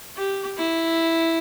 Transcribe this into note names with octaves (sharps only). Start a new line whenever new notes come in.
G4
E4